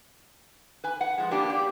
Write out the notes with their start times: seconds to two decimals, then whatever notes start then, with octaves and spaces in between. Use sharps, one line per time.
0.84 B4 G#5
1.01 F#5
1.18 F3 G#3
1.31 A#3 B3 D4 G4
1.50 G4 D5